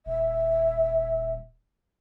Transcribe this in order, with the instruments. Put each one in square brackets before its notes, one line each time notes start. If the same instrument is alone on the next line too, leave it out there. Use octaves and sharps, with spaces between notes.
[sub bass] D#1 [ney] E5